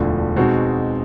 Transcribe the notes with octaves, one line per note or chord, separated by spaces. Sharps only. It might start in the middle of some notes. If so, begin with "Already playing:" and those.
Already playing: E1 D2 D3 F3 A3
B2 G#3 C4 D#4 F#4